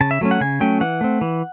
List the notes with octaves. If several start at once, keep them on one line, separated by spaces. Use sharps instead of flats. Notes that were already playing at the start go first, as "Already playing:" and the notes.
C#3 A5
E5
F#3 A3 C#4
F#5
C#3 G#5
F#3 A3 C#4 G5
E3 F#5
A3 C4
E3